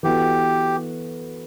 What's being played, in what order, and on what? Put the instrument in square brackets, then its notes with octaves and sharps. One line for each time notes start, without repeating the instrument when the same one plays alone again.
[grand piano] E3 B3 F#4 A4 [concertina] G4